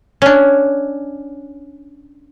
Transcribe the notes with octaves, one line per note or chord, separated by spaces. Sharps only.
C#4 D4